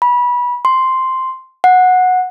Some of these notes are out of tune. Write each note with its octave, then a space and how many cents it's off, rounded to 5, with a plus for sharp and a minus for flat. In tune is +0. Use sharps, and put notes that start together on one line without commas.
B5 -20
C6 +0
F#5 -10